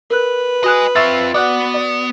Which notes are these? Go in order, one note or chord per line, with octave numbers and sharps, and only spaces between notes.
A#4 B4 F#6
F#4 D#5 G#5 D#6 F#6
C4 F4 E5 C#6 E6 A6
B3 F#4 D5 F#5 D6 F#6
D5